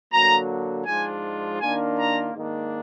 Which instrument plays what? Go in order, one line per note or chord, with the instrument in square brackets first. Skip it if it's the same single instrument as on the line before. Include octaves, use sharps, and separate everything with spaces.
[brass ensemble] D3 F#3 A#3 A#5
G#2 F3 G#3 D4 F4 G#5
D#3 A#3 D4 F4 G#5
A#5
G#2 D#3 A#3 D4